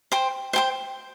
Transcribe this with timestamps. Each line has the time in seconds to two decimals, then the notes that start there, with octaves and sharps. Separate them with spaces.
0.12 C5 G5 C6
0.53 C5 G5 C6